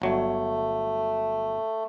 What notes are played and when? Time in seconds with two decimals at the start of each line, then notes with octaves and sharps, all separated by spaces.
0.02 G1 F#3 A3